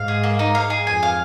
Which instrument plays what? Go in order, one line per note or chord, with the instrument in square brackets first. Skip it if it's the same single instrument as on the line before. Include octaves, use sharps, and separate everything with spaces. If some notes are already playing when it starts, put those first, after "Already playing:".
Already playing: [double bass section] G#2 [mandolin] F5
[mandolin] G#4
A#3
D#4
F5
G#4
[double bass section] F2 [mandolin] G#5
[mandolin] F5